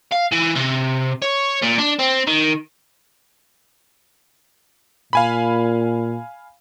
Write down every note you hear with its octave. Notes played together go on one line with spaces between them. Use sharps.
F5
E3
C3
C#5
A#2
D4
C4
D#3
A#2 F5 G#5 B5